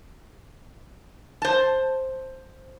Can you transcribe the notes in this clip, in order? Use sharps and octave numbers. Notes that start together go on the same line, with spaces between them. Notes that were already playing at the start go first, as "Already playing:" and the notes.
C5 A5